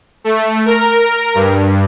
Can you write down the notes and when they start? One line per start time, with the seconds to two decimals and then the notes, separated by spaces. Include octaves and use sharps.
0.24 A3
0.66 A#4
1.35 G2